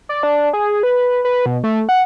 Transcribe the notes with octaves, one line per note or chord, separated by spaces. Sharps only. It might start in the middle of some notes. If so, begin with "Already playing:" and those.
D5
D4
G#4
B4
B4
B2
A3
F#5